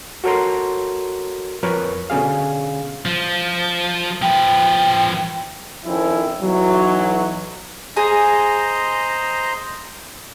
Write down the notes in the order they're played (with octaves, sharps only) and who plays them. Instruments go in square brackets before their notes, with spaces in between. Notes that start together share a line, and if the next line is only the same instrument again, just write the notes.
[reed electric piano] F#4 A4 A#4 C#5 A#5 C6
F2 A#4 B4 C#5
B2 D3 C#4 G#4 F5
[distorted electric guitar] F3
[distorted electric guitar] F3 B4 [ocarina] G5
[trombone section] F2 D#3 F3 C#4 D#4 E4
B1 E3 F#3
[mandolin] G#4 [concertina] C5 D#5 A#5